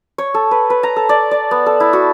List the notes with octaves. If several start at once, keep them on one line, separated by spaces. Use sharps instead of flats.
C#5
A4
B4
B4
A#5
A4
D5
D5
B3
A4
E4
F#4